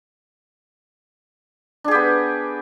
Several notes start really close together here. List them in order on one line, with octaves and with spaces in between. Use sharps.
D4 G#4 G4 B3